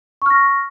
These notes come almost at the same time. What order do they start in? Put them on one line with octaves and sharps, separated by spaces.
C#6 F6 A#6